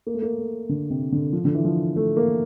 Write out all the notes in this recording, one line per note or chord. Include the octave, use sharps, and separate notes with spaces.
A#3
A3
A#3
A3
D3
C3
D3
F3
D3
E3
F3
A3
A#3